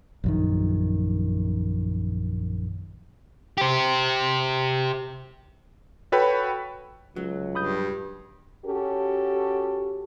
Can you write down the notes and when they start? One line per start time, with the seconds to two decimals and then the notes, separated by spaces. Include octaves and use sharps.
0.24 A#1 F#2 D#3
3.57 G4 C5
6.12 F#4 A4 B4 C#5 G5 B5
7.16 C#2 F#3
7.55 G2 B5 D#6 G6
8.65 C#4 F#4 G4 A4